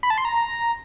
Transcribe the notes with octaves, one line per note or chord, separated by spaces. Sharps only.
B5
A5
C6
A#5